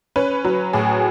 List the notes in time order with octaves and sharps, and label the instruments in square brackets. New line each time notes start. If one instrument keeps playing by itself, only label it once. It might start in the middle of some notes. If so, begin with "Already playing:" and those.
[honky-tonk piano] C#4 B4
F#3
A2 G#4